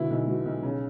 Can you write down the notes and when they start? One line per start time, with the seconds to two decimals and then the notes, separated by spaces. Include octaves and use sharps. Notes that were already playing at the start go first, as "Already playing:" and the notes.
Already playing: B2 D3 E4
0.10 B1
0.28 B2
0.46 B1
0.63 C#3